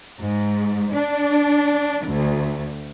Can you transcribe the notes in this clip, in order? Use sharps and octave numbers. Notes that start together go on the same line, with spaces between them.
G#2
D4
D2